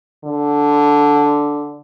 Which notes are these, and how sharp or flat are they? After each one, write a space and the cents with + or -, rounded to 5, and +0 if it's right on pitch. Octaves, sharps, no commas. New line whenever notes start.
D3 -5